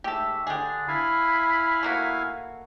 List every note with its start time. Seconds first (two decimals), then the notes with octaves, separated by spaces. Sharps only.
0.04 G#2 A3 G4 A4 E5
0.47 D3 D4 G4 G#4
0.88 E4 F5 G#5 B5
1.83 A3 A#3 F#4